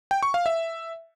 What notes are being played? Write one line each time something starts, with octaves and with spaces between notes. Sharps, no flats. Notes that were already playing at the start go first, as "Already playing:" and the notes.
G5
C#6
F5
E5